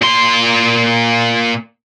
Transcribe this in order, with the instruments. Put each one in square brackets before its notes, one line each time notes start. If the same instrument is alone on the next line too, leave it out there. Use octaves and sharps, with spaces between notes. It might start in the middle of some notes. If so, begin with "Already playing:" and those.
[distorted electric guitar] A#2 C6